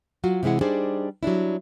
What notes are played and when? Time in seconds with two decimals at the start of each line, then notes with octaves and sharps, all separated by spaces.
0.24 F#3 F4 F#4
0.43 C3 E3 G#3 E4 F#5
0.61 G3 D4 D#4 G#4 C5
1.23 F#3 G3 D4 E4